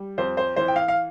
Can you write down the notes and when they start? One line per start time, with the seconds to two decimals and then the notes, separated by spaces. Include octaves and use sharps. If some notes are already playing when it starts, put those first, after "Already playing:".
Already playing: G3
0.18 F2 C5
0.37 C5
0.56 E3 C5
0.68 G5
0.76 F5
0.88 F5